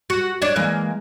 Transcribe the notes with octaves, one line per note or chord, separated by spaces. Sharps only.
F#4
D4 C#5 D5
E3 G#3 A#3